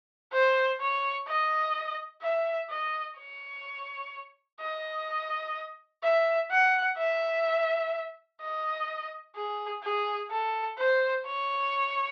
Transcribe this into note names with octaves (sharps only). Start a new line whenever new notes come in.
C5
C#5
D#5
E5
D#5
C#5
D#5
E5
F#5
E5
D#5
G#4
G#4
A4
C5
C#5